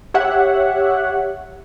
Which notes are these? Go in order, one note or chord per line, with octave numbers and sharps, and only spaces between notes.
G4 C#5 E5 F#5